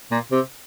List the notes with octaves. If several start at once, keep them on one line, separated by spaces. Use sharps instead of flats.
A#2
C3